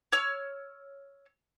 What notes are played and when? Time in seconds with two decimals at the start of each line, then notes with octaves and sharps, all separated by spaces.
0.12 C#5 E6 F6